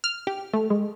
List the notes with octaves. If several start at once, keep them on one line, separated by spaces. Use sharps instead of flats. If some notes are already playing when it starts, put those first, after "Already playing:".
F6
G4
A3
G#3